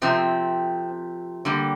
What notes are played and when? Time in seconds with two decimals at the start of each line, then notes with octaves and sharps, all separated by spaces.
0.02 C3 F3 A3 C4
1.45 D3 G3 A#3